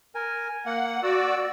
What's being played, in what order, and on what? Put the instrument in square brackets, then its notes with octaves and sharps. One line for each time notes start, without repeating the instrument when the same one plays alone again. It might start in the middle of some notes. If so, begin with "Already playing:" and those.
[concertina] A#4 G#5
[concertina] A#3 [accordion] F#5
[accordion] F#4 D5 [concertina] E6